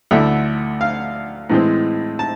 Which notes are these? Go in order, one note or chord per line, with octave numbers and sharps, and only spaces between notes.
D2 D3 A3 E4 E5
F5
A2 E3 G#3 C4
A5